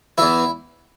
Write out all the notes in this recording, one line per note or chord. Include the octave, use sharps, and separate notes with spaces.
E2 E3 E4